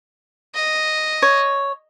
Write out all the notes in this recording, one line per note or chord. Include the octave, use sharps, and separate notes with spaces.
D#5
C#5